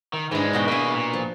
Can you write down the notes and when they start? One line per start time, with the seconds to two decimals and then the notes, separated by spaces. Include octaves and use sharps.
0.13 D#3
0.31 G#2 E3 G#3 D4
0.53 B2 F#4 G5
0.68 A#3 E4 G#4 B4
0.94 A#2
1.13 F3